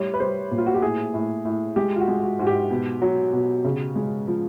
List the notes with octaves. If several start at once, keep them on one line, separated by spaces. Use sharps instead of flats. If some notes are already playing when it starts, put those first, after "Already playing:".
Already playing: A2 G3 C#5
B4
G3 C5
A#2
F4
F#4
G4
A2 G#4
A2
A2
G#3 G4
F4
F#4
G#3
F#4
G#2 F#4
G4
B2
F#3
B2
C#3
G#3
F3